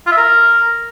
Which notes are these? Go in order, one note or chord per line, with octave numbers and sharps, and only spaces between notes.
F4
E5
A#4